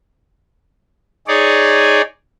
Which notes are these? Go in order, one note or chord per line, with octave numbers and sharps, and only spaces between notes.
D#4 G#4 C#5 D5